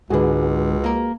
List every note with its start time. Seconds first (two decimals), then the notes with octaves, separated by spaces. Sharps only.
0.10 C#2 G#2 D3 F#4 G#4 B4
0.84 A#3 A#4